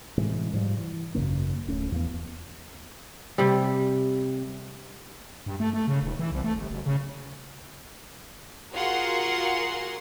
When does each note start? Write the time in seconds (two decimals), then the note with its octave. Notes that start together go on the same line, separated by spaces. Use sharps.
0.18 A2 C3 E3 G#3
0.53 G#2 F3 G3
0.78 E3
1.15 G#1 F#2 C#3 A#3
1.68 D1 A3 C#4
1.92 E2 F3 B3
3.38 C3 G3
5.46 G2
5.60 A3
5.73 A3
5.88 C#3
6.02 D#1
6.19 E3
6.32 C2
6.44 A3
6.57 G1
6.71 F#1
6.86 C#3
8.72 F4 F#4 G#4 A#4 F#5 C6